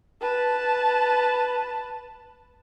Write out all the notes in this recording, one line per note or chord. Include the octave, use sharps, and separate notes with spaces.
B4 A5